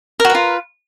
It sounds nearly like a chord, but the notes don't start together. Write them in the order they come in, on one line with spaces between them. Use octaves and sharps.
A#4 F#4 B4 F4